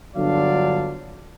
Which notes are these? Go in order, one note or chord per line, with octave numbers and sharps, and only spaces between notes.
G1 D3 F#3 D4 D5 F5